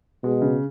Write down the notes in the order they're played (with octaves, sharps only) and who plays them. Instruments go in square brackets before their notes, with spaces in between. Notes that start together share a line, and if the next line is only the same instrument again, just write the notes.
[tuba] B2 [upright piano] G#3
[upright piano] C#3